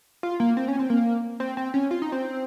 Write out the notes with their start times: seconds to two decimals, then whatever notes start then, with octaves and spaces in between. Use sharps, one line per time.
0.23 F4
0.40 A#3
0.57 C4
0.68 C#4
0.79 C4
0.90 A#3
1.40 C4
1.57 C4
1.74 C#4
1.91 F4
2.02 D#4
2.12 C4